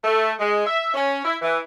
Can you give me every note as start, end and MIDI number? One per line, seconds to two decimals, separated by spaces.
0.03 0.32 57
0.39 0.61 56
0.66 0.93 76
0.94 1.22 61
1.24 1.35 64
1.41 1.58 52